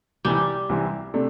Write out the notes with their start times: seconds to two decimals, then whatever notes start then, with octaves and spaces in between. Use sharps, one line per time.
0.25 C2 C3 E3 G3 C4 E4
0.69 C2 C3 E3 C4 E4
1.14 C3 A3 D4